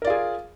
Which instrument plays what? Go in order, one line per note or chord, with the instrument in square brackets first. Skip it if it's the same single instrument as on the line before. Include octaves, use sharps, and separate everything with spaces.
[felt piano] A#4
D5
F4
G#4